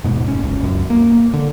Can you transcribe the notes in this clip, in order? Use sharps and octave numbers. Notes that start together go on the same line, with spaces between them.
D#1 A#1 G#2 B2
F1 C#4
F#1 C#2
C2 F#2
A#3
D3